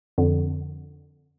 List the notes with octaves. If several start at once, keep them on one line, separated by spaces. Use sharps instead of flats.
F2 D3